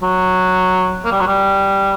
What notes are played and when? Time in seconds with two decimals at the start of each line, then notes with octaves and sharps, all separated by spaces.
0.02 F#3
1.05 A#3
1.12 G3
1.20 F#3
1.27 G3